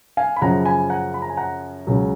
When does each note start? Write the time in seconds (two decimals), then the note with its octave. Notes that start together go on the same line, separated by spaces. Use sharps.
0.17 F5 G#5
0.36 B5
0.42 F#2 C#3 F3 F#5 A#5
0.60 A#5
0.65 G#5 B5
0.90 F#5 A#5
1.14 B5
1.22 A#5
1.30 G#5
1.37 F#5 A#5
1.87 C#2 C#3 F#3